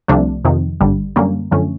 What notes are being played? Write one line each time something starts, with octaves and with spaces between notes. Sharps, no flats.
C2 C3 F3 A3 D4
F2 C3 D#3
G#1 G2 D3 G3
F#2 D3 G3 A#3 C#4
F#2 D3 F3 A3 C#4